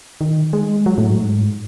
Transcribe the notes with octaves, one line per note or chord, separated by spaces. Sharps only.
D#3
G#3
F#3
A2
G#2